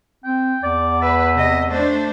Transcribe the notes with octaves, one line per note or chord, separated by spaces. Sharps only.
C4 G5
E2 D5
B4 E5
C3 D#5
A3 D4 C5